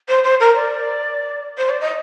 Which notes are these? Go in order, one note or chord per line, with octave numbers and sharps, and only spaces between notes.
C5
C5
A#4
D5
C5
D5
D#5